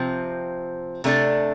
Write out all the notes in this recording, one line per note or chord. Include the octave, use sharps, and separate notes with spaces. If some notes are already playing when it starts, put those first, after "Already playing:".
Already playing: C3 F3 C4
C3 A3 D4 A4